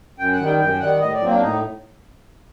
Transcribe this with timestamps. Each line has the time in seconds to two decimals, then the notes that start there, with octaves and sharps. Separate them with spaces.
0.18 F#2 G5
0.32 F#5
0.39 D#3 G3
0.46 G5
0.59 F#2 G5
0.80 D#3 G3 F#5
1.00 A2 D#5
1.13 D5
1.20 F#3 A#3 C4
1.31 D4
1.40 A2 D#4